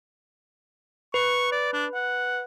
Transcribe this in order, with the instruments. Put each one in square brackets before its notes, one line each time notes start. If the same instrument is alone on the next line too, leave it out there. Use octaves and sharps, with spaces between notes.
[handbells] B4 [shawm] C#6
[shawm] D5
D4
F#5